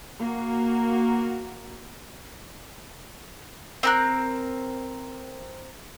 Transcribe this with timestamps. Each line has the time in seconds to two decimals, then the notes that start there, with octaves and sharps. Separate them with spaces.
0.20 A#3 F#4
3.83 C4 A#4 F#6